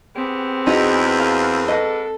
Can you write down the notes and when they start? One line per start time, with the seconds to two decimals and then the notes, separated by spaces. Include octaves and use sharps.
0.16 B3 C4 G4 G#4
0.67 E2 D#4 F#4
1.19 A#4 F5
1.68 G#2 A4 B4 D#5